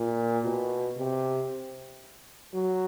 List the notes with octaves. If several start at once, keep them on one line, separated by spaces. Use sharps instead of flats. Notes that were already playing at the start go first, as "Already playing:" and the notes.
Already playing: A#2
B2
C3
F#3